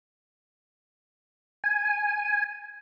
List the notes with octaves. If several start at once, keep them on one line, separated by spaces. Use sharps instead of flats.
G#5